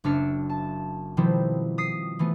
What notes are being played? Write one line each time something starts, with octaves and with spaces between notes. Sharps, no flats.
F#1 D4 E5 F6 C#7
A5
B2 D#3 F3 G3 C4 E4
D#6 B6 C7
E3 A3 B3